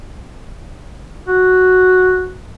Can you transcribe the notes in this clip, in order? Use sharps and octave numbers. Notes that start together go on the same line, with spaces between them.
F#4